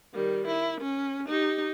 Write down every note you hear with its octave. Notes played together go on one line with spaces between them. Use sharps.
D#3 G3
E4
C#4
D#4 G4